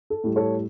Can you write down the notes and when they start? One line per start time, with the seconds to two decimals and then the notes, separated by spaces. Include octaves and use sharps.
0.10 A4
0.24 A2 G3
0.36 A4 C#5